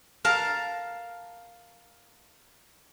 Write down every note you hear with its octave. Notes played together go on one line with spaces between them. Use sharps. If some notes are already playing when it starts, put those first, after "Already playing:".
A#4 F5 A5 A#5